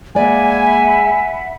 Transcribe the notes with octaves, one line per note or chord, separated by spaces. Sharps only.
G#3 A#3 D5 E5 F#5 G#5 B5